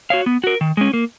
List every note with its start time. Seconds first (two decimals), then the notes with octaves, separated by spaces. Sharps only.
0.10 F#4 C#5 F5
0.26 B3
0.44 F#4 A#4
0.61 D#3
0.77 G#3 C#4
0.93 A#3